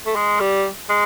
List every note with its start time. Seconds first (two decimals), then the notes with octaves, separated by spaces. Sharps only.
0.06 A3
0.16 G#3
0.40 G3
0.90 G#3